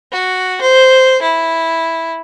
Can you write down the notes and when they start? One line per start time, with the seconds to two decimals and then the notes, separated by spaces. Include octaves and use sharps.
0.12 F#4
0.61 C5
1.22 E4